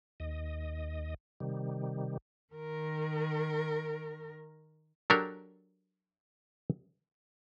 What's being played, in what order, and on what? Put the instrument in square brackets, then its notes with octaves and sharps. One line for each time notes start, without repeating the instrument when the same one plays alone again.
[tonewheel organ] D#2 D#5
C3 D#3 G3
[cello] D#3 A#4
[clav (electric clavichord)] F#3 D4 G4 A4 A#4